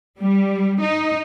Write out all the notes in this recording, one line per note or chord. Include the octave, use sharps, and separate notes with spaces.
G3
D#4